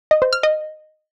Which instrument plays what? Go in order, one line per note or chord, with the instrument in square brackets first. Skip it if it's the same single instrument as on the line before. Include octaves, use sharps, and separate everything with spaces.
[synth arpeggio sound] D#5
C5
F6
D#5